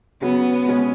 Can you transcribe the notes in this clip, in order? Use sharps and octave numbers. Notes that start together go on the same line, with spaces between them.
C#3 F#3 B3 C#4 F#4
B2 G#3 C#4 G#4